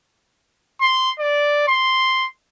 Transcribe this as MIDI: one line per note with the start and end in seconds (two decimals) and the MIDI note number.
0.81 1.11 84
1.19 1.65 74
1.68 2.27 84